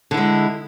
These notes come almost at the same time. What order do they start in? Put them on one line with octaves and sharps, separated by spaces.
D3 E4 G#3